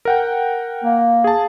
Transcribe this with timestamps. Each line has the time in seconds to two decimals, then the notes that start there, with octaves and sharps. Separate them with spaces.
0.05 A#4 F#5 G5
0.84 A#3
1.24 G#4 A5